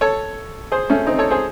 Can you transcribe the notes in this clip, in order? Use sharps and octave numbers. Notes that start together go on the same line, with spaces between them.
A4 C#5
G#4 C5
A3 C#4
C4 D#4
A4 C#5
G#4 C5